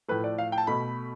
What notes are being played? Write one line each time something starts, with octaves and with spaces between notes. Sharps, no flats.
A2 F3 A3 B4
D5
F5
G5
A5
B2 A3 B5